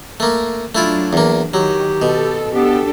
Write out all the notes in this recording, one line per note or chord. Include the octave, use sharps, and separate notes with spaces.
A3 A#3
F#3 A3 D4 E4 F4
E2 A#3
D#3 F#3 G4
B2 A4
B3 D4 G4 A4